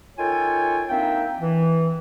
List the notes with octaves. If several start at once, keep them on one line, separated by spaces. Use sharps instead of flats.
D#3 F4 A4 C#5 G5 G#5
A#3 C4 D4 D#4 E5 G5
E3